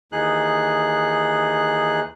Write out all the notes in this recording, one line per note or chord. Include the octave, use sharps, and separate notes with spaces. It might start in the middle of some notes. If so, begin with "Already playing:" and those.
D#2 E3 D#4 G#4 F#6